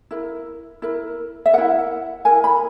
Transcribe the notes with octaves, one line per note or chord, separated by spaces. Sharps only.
E4 A#4
E4 A#4
E5
E4 A#4 F#5
E4 A#4 G#5
B5